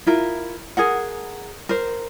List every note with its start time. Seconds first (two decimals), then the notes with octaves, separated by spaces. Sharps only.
0.06 E4 F4 A#4
0.77 G#4 A#4 F#5
1.69 A#4 C5